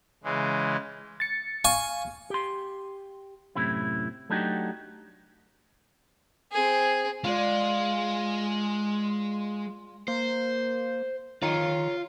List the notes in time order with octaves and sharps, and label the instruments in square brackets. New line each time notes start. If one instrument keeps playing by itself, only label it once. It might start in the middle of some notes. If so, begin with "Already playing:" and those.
[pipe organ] C#3 E3 G#3
[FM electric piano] A6 C#7
[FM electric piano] F5 [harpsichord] G#5 C#6
[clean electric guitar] G4 C6
F#2 A2 C3 E4
F#3 A3 D4 D#4 F#4 G4
[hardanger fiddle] C4 G#4
[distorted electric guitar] G#3 [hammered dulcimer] F4 D5
[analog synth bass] A#3 [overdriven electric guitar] C5
[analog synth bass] D#3 [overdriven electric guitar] F4 [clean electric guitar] C#5 F5 A#5